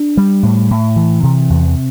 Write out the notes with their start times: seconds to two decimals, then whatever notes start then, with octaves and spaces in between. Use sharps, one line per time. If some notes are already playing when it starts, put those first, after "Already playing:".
Already playing: D4
0.17 G3
0.43 A2
0.71 A2
0.96 E3
1.23 C3
1.50 E2